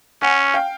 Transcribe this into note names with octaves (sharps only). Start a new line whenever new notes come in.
C#4 F#5 G#5
F5 G5